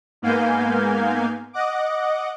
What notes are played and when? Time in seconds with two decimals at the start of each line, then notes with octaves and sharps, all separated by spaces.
0.22 G#2 A#3 B3 F5 G#5 G6
1.53 D#5 F#5 D6